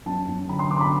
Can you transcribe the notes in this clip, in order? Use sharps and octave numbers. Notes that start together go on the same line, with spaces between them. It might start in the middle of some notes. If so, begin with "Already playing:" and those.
F#2 A5
F#2
D3 B5
C6
D3 D6
C6
B5